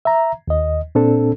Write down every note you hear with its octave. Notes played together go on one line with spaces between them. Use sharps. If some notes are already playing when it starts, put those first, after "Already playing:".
E5 A#5
D#2 D#5
A#2 C4 D4 A4